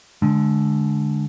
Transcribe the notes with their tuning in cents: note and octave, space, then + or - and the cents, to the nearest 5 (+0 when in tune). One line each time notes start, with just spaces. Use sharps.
D3 +0 G#3 +20